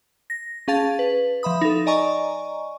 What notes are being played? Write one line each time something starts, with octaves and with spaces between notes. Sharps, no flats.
A#6
C#4 G#4 F5 A5 A6
B4
F3 E5 B5 D#6
D#4 A4
D5 D#5 G#5 A#5 C#6